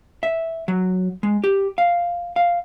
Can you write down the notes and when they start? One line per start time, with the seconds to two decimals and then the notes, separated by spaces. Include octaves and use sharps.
0.23 E5
0.68 F#3
1.23 G#3
1.44 G4
1.78 F5
2.36 F5